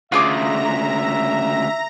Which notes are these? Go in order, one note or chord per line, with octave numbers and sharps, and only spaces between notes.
D2 C#3 F4 G#4 E5 A#5 D6 A#6